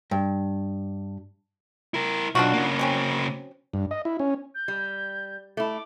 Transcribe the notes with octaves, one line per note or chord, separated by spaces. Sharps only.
G2
E4 A#4
B1 D4 F4 F#4
C#3 A#3
F#3 C4 C#4
G2
D#5
E4
C#4
G6
G3
A3 E4 D6